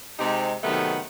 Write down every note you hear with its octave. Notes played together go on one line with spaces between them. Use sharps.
C3 G#3 C4 D#4 G4
C3 D#3 F#3 A3 B3 C4